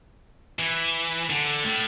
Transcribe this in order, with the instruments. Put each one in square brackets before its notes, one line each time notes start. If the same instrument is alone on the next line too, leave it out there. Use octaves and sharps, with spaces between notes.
[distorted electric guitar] E3
D3
A2